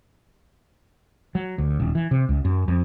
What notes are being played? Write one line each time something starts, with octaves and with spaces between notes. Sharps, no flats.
F#3
D2
D#1
E3
C3
C#2
F#2
F2